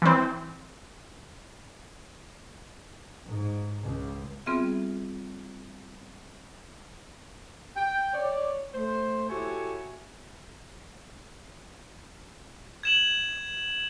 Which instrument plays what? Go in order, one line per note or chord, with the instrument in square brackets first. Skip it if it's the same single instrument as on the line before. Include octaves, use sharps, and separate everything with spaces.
[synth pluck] E3 C4
[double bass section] G#2
C#2
[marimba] G3 B3 C4 F4 G#4 E5
[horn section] G5
C#5 D5
A3 C5
E4 F#4 G4 A4 C#5 G#5
[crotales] G#6 E7 F#7